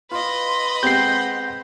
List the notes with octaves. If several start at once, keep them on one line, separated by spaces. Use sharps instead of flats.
F4 B4 D#5 C6
G#3 C4 G4 F#5 G6 C7